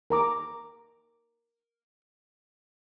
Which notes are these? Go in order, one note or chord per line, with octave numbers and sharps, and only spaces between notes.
A#4 A#5 D6